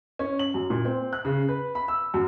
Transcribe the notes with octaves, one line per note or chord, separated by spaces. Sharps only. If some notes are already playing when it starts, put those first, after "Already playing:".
C#4
F#7
F#2
A#2
C4
F#6
C#3
B4
B5
E6
F#2